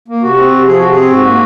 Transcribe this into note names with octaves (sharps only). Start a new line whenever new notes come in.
A#3
C3 F#4
C4
C3
F3 G#4
C3 F#4
G#4
C4
G#2 F#4
A#3